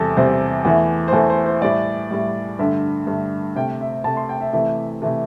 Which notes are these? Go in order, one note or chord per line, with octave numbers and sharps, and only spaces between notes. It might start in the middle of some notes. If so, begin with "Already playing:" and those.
Already playing: E2 C3 G3 A4
E2 C3 G3 C5
E2 E3 A3
C5
E2 E3 A3 A4
C5
C5
A2 G3 D5
A2 G3
G2 D3 A3 E5
G2 D3 A3
C3 A3 G5
E5
C3 A3 A5
C6
G5
E5
C3 E3 A3 E5
C3 E3 A3